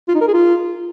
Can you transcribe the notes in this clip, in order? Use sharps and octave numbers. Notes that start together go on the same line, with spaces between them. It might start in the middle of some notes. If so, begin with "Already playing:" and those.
F4
D#4
A#4
G#4
F4